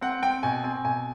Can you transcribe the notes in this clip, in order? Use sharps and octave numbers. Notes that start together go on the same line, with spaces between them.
C4 F#5
C4 G5
B2 G#5
C4 G#5
B2 G#5